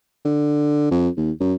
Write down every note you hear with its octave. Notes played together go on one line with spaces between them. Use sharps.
D3
F2
D#2
F#2